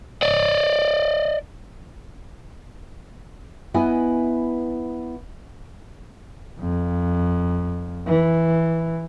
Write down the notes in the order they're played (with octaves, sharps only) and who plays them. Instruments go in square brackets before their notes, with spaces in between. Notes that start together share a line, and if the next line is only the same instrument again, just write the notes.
[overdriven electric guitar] D5 D#5
[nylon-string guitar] B3 E4 B4 D#5 G#5
[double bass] F2
E3